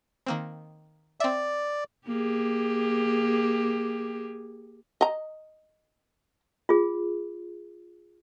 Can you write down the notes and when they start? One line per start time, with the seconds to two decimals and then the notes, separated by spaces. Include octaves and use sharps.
0.26 D#3 A#3 C4
1.20 C4 D5 E5
2.07 A#3 G4 G#4
5.01 D#5 A#5
6.69 F4 G#4